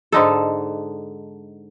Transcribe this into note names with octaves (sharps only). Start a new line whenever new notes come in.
G#2 D3 D#4 A4